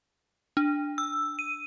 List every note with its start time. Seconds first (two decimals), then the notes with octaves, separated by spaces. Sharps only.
0.57 D4
0.98 E6
1.39 D#7